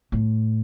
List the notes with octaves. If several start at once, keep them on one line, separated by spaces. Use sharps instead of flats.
A2